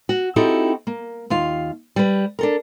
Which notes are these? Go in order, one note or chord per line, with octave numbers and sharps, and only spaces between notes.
F#4
C4 D#4 E4 F#4 G4 A4
A#3
D#2 F4 F5
G3 B4
D4 A4 A#4